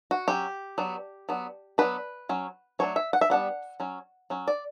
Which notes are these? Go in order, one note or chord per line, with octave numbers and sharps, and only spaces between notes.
F#4
F#3 C#4 G4
F#3 B3 D4
F#3 B3 D4
F#3 B3 D4 B4
F#3 C#4
F#3 A3 D4 C#5
E5
F#5
E5
G3 B3 D4 F#5
F#3 C#4
F#3 C#4
D5